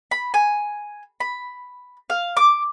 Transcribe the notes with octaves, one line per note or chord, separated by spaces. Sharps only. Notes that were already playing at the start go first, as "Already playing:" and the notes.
B5
G#5
B5
F5
D6